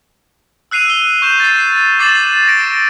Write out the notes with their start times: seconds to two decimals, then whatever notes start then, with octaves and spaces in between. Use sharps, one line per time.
0.71 E6 F#6 C7 D#7 F7
0.90 G7
1.22 C#6 G6 E7
1.40 A6 C7
1.99 D6 A6 C7 E7 F#7
2.48 A#6 D7